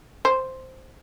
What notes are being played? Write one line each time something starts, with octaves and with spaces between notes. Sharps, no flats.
C5